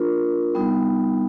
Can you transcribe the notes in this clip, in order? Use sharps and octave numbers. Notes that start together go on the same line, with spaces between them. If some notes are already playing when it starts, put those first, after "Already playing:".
Already playing: A#3 D4 F4 A#4
G3 B3 D#4